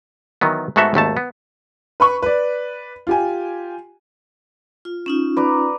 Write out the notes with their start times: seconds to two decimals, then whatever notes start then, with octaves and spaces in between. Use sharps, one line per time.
0.41 D#3 E3 F#3 B3
0.76 G#2 A3 B3 F#4 A4 E5
0.94 G#1 D#2 A3 A5
1.17 B3
2.00 B4 B5 C#6
2.22 B4 D5
3.07 F4 G4 G#5
4.85 F4
5.06 C#4 D#4 F4
5.37 B4 D5 A#5